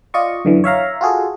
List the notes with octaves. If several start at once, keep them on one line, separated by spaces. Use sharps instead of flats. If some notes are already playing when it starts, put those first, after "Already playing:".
F4 D5 D#5 C#6
F#2 D3 E3
C#5 E5 F5 A#5
F4 F#4 G#4 A4